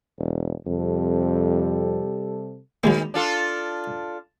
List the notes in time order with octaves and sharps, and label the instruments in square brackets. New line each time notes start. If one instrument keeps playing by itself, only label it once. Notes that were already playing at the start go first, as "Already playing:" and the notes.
[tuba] E1
[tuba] F2 [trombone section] C3 G3 A4
[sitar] D#3 [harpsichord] F#3 G#3 A#3
[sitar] D4 F4 A4